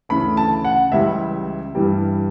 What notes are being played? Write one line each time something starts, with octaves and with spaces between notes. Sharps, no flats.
D2 C#3 E3 A3 B5
A5
F#5
C#2 C#3 E3 G3 E5
G2 E3 G3